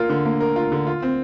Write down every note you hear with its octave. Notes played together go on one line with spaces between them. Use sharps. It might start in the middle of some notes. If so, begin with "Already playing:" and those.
Already playing: A#3 F4 A#4
D3
A#3
A#4
F4
D3
F4
C4